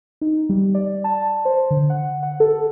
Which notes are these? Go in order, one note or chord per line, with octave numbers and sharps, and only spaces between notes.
D#4
G3
D5
A5
C5
D3
F#5
F#5
A4